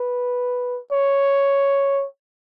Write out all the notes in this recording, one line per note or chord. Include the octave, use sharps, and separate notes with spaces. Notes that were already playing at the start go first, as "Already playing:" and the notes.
Already playing: B4
C#5